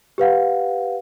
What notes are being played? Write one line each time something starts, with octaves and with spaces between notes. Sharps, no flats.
G4 B4 F5 F#5